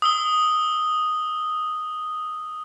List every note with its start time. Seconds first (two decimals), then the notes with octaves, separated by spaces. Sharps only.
0.02 D#6 E6 G7